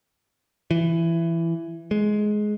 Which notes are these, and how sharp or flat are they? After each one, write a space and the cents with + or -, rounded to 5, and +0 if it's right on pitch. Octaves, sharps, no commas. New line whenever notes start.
E3 +15
G#3 +15